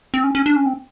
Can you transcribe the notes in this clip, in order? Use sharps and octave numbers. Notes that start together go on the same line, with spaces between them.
C4
C#4
C#4
D4
C#4
C4